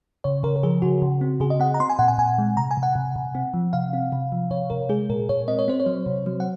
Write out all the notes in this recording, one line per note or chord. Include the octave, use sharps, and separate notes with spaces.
C#3 C#5
C#3 A#4
A#4
F3 G#4
C#3 F#4
C#3
C4
C#3 G#4
D#5
C4 F#5
A#5
C4 C6
G#5
A#2 F#5
G#5
A#2 G#5
G#3
C3 A#5
G#5
C3
F#5
C3
C3
C4
F3
C3 F5
C4
C3
F3
C3 C#5
C3 A#4
G#3 G#4
A#2 A#4
A#2 C#5
C4 D#5
C#5
C4 C5
C#5
F#3
C3
F#3
F#5